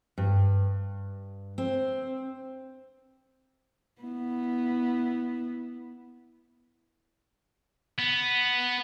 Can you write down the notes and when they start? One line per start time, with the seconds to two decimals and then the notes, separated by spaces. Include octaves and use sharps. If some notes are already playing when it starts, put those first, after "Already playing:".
0.18 G2
1.58 C4
4.02 B3 E4
7.99 B3